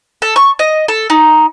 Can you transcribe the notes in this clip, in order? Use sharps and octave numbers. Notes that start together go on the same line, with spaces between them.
A4
C#6
D#5
A4
D#4